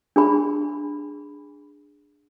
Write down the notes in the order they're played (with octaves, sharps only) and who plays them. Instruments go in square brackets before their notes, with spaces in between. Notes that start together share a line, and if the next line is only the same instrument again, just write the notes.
[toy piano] D4 G#4 B5